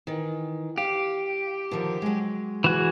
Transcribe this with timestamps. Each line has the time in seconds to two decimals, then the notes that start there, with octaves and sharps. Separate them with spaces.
0.07 D#3 E3
0.78 G4 F5
1.71 D3 D#3 F3
2.02 F#3 G#3
2.64 E3 F#4 G#4